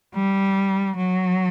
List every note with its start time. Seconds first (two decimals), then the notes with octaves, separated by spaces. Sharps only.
0.15 G3
0.97 F#3